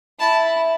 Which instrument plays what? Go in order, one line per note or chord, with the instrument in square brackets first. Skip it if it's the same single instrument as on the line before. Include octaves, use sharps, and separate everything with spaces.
[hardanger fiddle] E4 [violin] A5